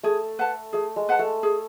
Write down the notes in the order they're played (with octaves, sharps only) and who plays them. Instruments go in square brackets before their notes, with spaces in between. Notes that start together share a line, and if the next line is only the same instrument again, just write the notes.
[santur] A3 [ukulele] G#4
[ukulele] B4 F#5 A5
[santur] A3 [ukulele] G#4
[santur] G#3
[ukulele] B4 F#5 A5
[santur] A3
[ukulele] G#4